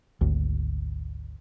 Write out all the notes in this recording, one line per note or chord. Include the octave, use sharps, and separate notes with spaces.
G#1 D2